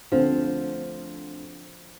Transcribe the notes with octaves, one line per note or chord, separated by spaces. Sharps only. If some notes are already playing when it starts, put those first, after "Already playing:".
D2 D3 F3 A3 C4